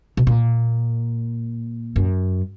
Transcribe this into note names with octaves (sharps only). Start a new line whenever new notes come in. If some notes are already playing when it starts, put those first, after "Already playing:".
B2
A#2
F#2